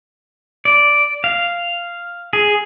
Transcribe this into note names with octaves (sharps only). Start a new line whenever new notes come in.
D5
F5
G#4